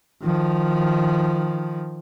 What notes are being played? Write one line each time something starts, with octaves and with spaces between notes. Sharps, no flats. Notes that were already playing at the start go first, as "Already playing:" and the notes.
D#3 F3